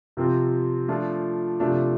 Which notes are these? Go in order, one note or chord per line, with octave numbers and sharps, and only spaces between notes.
C3 F3 C4 F4
F3 A3 D4 F4
C3 F3 A3 D4 F4